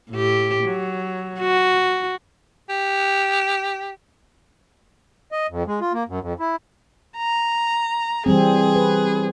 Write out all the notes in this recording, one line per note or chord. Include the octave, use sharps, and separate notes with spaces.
A2 G4
F#3
F#4
G4
D#5
F2
G#3
F4
A#3
F#2
F2
E4
A#5
E3 G3 C4 G#4
B4